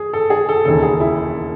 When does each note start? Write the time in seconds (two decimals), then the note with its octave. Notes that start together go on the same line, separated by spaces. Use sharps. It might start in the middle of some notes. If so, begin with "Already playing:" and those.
Already playing: G#4
0.13 A4
0.30 G#4
0.49 A4
0.65 E1 D#2 C#3 A4
0.83 G#4
1.00 E4